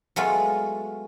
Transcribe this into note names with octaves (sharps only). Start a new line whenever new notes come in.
F#3 G#3 A3 B3 F4